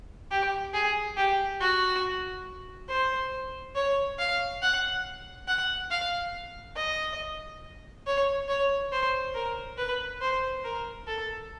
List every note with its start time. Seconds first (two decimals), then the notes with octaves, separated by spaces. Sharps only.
0.31 G4
0.74 G#4
1.17 G4
1.60 F#4
2.89 C5
3.75 C#5
4.19 F5
4.62 F#5
5.48 F#5
5.90 F5
6.76 D#5
8.06 C#5
8.48 C#5
8.92 C5
9.34 A#4
9.78 B4
10.21 C5
10.64 A#4
11.07 A4